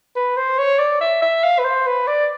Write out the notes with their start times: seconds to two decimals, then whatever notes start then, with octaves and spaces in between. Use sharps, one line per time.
0.16 B4
0.37 C5
0.58 C#5
0.79 D5
1.01 E5
1.22 E5
1.44 F5
1.59 B4
1.65 C5
1.87 B4
2.08 D5